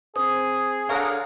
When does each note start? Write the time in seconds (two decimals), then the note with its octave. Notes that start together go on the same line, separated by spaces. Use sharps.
0.16 C4 G#4 D#6
0.89 D3 A#4 C#5 F5 F#5